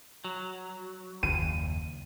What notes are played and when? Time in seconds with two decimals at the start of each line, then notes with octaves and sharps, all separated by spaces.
0.24 F#3
1.23 F#1 D#2 C#3 D#7